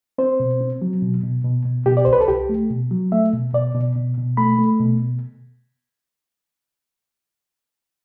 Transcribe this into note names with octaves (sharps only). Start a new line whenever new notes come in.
C4 C5
B2
C4
F#3
B2
B2
B2
B2
B2 G4
D5
C2 C5
B4
A4
C2 G4
A3
B2
F#3
A3 E5
B2
B2 D5
B2
B2
B2
A3 B5
A3
B2